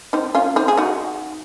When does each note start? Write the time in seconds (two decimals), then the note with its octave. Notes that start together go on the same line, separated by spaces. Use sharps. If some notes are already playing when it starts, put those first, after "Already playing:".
0.13 C4 D#4
0.35 C#4 F4
0.56 C4 D#4
0.68 G#4
0.77 D#4 F#4